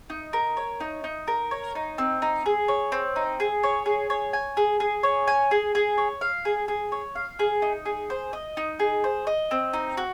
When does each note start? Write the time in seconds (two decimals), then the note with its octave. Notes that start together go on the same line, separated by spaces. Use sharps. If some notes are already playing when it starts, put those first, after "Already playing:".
0.10 D#4
0.33 A#4
0.57 C#5
0.80 D#4
1.04 D#4
1.28 A#4
1.51 C#5
1.75 D#4
1.98 C4
2.22 D#4
2.46 G#4
2.68 C#5
2.92 C4
3.16 D#4
3.40 G#4
3.63 C#5
3.86 G#4
4.10 C#5
4.33 G#5
4.57 G#4
4.80 G#4
5.03 C#5
5.27 G#5
5.51 G#4
5.75 G#4
5.98 C#5
6.21 F5
6.45 G#4
6.68 G#4
6.92 C#5
7.15 F5
7.39 G#4
7.62 D#4
7.86 G#4
8.10 C5
8.33 D#5
8.57 D#4
8.80 G#4
9.04 C5
9.27 D#5
9.51 C4
9.73 D#4
9.97 F#4